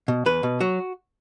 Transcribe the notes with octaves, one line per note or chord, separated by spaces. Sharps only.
B2
E2 B4
B2
F#3 F#4